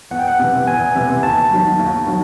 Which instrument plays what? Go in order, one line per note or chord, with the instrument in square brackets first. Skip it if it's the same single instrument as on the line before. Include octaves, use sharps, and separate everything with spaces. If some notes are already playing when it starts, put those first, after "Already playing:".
[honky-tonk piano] E2 [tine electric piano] F#5
[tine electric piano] G5
F#5
[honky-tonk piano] C3 E3
[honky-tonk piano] E2 [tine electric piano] G#5
[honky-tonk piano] C3 E3
[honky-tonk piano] D#2 [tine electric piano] A5
[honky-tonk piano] D#3 F#3
D#2
D#3 F#3